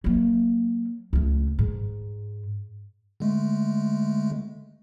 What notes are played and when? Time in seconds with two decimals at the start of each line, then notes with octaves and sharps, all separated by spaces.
0.04 F#3 A#3
1.13 C#2 A3
1.59 G#2
3.20 D3 G#3 A3